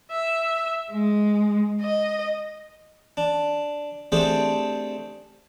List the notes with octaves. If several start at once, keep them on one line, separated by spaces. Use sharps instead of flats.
E5
G#3
D#5
D4
A3 C4 D4 G4 G#4